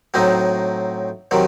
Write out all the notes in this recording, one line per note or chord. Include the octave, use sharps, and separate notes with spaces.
A2 F#3 C4 D#4
C3 D#3 F#3